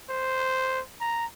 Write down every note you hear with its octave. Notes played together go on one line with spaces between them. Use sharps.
C5
A#5